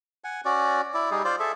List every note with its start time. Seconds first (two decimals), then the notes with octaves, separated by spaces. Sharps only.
0.24 F#5 G#5
0.45 C#4 F#4 D5
0.94 E4 D5
1.11 G3 D#4 G#4
1.24 F4 C5 D5
1.40 G#4 A4 E5